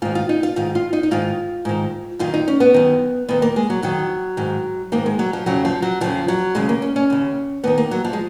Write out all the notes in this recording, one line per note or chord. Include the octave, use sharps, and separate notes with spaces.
G#2 D#3 F4
F4
D#4
F4
G#2 D#3 F4
F4
D#4
D#4
G#2 D#3 F4
G#2 D#3
F#2 D#3 F4
D#4
C#4
B3
F#2 D#3
F2 D#3 B3
A#3
G#3
F#3
F2 D#3 F#3
G#2 D#3
G#2 D#3 A#3
G#3
F#3
F3
F2 C#3 F#3
F3
F#3
F2 C#3 F3
F#3
D#2 C#3 G#3
A#3
C#4
C#4
D#2 C#3
D#2 D#3 B3
A#3
F#3
F3
G#3